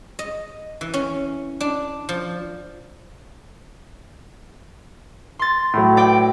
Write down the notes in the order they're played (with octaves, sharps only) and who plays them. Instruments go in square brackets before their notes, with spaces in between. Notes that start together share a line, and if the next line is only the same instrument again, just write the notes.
[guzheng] D#5
E3
C#4
D4
F3
[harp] C6 A6
[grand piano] A2 F#3
[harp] D5 G5